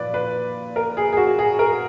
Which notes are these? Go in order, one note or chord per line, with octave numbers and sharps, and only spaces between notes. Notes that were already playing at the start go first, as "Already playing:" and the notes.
Already playing: A#2 F3 B4 D5
B4
A#4
G#4
G#4
F#4
G#4
A#4